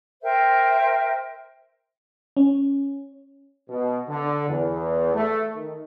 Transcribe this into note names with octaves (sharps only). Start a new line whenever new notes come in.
A#4 C5 E5 G5
C#4
B2
D3
E2
A3
D#3